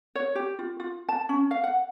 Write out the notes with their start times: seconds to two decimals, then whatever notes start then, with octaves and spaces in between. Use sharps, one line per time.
0.15 C#5
0.35 G4
0.59 F4
0.80 F4
1.09 A5
1.29 C#4
1.51 F5
1.64 F#5